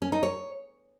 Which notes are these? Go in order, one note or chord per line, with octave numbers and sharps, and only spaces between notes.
C#4
D#4
C#5